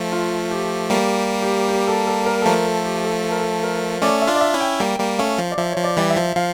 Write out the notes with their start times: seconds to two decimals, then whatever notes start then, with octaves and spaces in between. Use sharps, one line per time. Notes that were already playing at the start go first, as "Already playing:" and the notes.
Already playing: F3 A3
0.12 F4
0.51 G4
0.90 G3 A#3 G4
1.15 G4
1.42 G4
1.69 G4
1.88 A4
2.07 A4
2.26 A#4
2.42 A4
2.45 F3 A3 A#4
2.65 A4
2.79 A4
2.85 G4
3.04 A4
3.24 A4
3.32 A#4
3.39 A4
3.63 A#4
4.01 A3 C#4 D5
4.22 E5
4.27 D4 F4
4.35 D5
4.41 E5
4.54 C#4 E4
4.60 G5
4.80 G3 A#3 G5
4.99 G3 A#3
5.19 A3 C#4 F5
5.38 F3
5.52 D5
5.57 F3 E5
5.72 C#5
5.77 F3
5.84 D5
5.97 E3 G3 D5
6.10 E5
6.17 F3
6.36 F3 F5